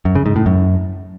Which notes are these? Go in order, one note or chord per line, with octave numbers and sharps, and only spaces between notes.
F#2
C#3
G#2
A2
F#2